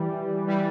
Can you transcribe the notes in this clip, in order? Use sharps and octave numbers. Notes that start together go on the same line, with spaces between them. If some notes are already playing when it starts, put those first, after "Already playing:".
Already playing: E3 G3
E3 G3